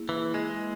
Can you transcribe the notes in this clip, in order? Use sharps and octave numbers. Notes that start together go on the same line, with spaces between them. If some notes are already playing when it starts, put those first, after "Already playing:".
Already playing: A#3 E4 G#4
E3
G#3